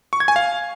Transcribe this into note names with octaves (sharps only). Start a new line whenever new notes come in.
C#6
G#6
G#5
F5